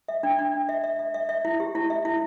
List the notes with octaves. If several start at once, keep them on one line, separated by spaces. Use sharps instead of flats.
E5
D4
D4
D4
E5
E5
E5
E5
E5
E4
G4
E4
E5
E4